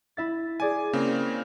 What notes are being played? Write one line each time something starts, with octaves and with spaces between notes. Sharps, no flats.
E4 E5 A6
G#4 D5 G#5 G#6
C#3 A#3 C4